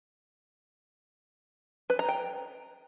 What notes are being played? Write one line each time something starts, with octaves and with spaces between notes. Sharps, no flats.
B4
A#5
G5